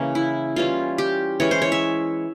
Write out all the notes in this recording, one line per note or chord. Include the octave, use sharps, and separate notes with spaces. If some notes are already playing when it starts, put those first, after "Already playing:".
Already playing: C#3 E3 A#3 C#4
E4
E3 G3 C#4 F4
G4
E3 G#3 C#4 C#5
C5
C#5
E5